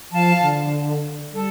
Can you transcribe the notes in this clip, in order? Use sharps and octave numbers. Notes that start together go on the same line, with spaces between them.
F3 F5 A5
D3
G3 A4